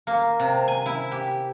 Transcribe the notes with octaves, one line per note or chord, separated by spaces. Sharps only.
A#3
C3
G#5
E4
G4